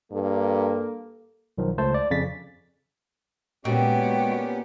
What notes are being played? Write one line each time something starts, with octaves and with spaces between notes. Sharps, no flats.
G2 A#3 A4
B1 D#3 F3 F#3
C#2 A3 C5 A5
D5
F2 C#3 A6 B6
A#2 G#3 B3 C#4 F#4 G4 G5